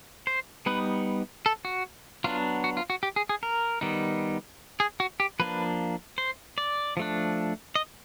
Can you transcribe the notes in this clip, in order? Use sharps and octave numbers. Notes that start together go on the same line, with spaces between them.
C5
G3 B3 D#4 B4
A4
F#4
F#3 B3 D4 F4
F#4
F4
F#4
G4
G#4
G#4
A#4
D#3 G3 B3 D#4
G#4
F#4
G4
F3 A#3 D4 B4
C5
D5
F3 A3 D4
D#5